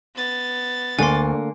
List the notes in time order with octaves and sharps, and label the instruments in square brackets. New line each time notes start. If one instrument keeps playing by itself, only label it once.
[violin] B3 A6
[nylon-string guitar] D2 [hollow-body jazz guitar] D3 A#3 [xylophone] G#5 C6